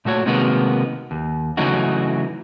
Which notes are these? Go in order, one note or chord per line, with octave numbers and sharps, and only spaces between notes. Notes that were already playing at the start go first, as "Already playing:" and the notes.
A#2 A3 F#4 C#5
C3 D#3 G#3 A#3 B3 F#4
D#2
C#3 E3 F#3 A3 D#4 F#4